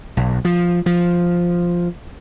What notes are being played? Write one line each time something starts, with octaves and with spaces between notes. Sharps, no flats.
B1
F3
F3